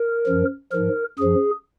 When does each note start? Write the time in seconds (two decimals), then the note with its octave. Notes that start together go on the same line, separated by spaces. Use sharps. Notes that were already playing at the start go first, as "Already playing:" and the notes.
Already playing: A#4
0.27 F#2 F3
0.72 G#2 F3 A#4
1.19 F#2 F3 G#4